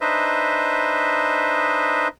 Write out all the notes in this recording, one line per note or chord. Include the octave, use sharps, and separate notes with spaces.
D4 D#4 B4 C5 D#5 E5